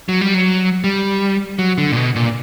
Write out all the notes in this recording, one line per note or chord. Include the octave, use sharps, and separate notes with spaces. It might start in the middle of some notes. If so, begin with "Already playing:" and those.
F#3
G3
F#3
G3
F#3
D3
A#2
B2
A#2